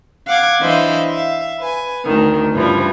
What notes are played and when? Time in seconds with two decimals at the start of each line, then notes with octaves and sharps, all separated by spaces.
0.26 F5 F#5 D6 G#6
0.60 E3 D4 E4 C5 D#5 F5
1.10 E5 F5
1.60 B4 G#5
2.05 D2 D#3
2.52 G2 C#3 E3 F3 G3